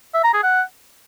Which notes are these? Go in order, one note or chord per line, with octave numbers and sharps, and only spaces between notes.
E5
A#5
G#4
F#5